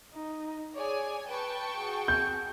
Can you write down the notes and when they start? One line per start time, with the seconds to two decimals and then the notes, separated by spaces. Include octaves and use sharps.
0.14 D#4
0.75 G#4 C#5 D5 G#5
1.29 B4 G5 A5 C#6
1.77 F#4 G#4
2.08 G6